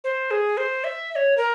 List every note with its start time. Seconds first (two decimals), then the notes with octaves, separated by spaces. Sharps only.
0.04 C5
0.31 G#4
0.57 C5
0.84 E5
1.11 E5
1.16 C#5
1.38 A#4